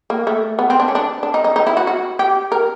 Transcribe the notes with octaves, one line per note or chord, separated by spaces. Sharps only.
A#3
A3
B3
C4
D4
C#4
D4
D4
D#4
D#4
D#4
E4
F#4
F#4
G4
A#4